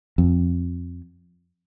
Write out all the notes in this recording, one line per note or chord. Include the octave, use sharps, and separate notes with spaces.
F2